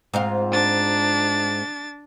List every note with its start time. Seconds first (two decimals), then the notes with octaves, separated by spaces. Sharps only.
0.14 G#2 C4 F4
0.52 D4 A6